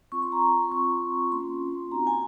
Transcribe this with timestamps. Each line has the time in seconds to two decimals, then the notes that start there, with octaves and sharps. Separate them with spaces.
0.12 C4 F4 C#6
0.22 C6
0.32 A#5
0.42 C6
0.62 C6
0.72 C4 F4 C#6
1.32 A#3 C#4 F4 C6
1.91 C4 D#4 F#4 A#5
2.07 G#5